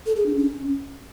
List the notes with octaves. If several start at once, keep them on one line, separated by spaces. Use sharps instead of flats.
A4
G#4
D4
C#4